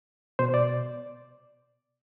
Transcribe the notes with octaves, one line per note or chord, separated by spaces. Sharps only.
B2 C5
D5